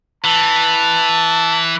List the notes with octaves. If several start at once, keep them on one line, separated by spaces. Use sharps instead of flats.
E3 A5